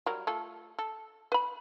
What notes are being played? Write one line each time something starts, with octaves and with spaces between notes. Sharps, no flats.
F#3 G3 A#4
A3 F4 A4
A4
B4 B5